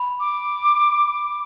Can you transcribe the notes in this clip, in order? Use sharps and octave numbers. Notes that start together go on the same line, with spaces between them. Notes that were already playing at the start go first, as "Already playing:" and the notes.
Already playing: B5
D6